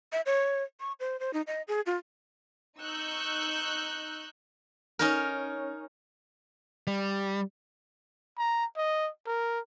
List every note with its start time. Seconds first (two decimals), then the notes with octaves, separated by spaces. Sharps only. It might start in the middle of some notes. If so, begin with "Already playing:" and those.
0.13 E5
0.26 C#5
0.80 C#6
1.00 C5
1.20 C5
1.33 D#4
1.47 D#5
1.68 G#4
1.86 F4
2.79 D#4 C#6 E6 F#6 G6
4.99 C#4 D#4 A#4
6.87 G3
8.38 A#5
8.76 D#5
9.27 A#4